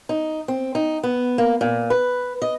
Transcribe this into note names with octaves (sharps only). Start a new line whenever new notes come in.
D#4
C4
D#4
B3
A#3
A#2
B4
D#5